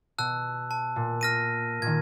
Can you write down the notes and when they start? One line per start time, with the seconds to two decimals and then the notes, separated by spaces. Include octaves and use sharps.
0.18 B2 A5 E6 F#6
0.71 A5
0.96 A#2
1.21 F6 A#6 D#7
1.82 A#2 D#3 G#6